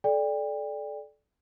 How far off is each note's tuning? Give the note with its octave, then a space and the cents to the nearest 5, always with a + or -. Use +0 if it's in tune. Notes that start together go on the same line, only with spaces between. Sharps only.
A4 -25 D5 +0 G5 +30